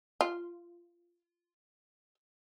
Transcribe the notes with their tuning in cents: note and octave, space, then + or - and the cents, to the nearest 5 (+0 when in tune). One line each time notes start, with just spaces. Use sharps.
F4 -15